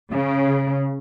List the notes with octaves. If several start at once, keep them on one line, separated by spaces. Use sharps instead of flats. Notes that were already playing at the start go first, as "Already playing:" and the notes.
C#3